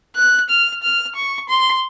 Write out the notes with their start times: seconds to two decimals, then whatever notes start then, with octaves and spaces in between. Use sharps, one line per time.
0.16 F#6
0.49 F6
0.83 F6
1.15 C#6
1.49 C6